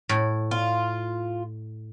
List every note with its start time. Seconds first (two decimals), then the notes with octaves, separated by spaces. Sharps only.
0.09 A2
0.51 F4